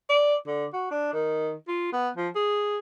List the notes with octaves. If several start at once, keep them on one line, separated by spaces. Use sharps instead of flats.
D5
D3
F#4
D4
D#3
F4
B3
F3
G#4